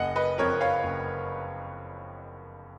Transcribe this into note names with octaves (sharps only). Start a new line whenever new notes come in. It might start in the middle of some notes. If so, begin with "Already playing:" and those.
Already playing: F#1 D#5 F#5
B4 D#5
F2 F3 A#4 C#5
C#5 F5
F#1